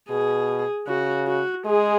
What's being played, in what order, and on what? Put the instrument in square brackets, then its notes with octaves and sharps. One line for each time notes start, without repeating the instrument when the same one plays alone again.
[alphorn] B2 [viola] G#4
[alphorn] C#3 [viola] F#4
[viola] F#4
[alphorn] G#3 [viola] G#4